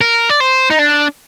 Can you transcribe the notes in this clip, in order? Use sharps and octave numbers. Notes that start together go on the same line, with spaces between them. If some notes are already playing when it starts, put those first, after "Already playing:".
A#4
D5
C5
D#4
D4